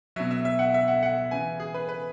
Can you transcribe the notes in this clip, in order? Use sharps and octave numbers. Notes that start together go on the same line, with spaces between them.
B2 F#3 E5
E5
E5
F#5
E5
F#5
F#5
C#3 E3 G#5
G#4
B4
B4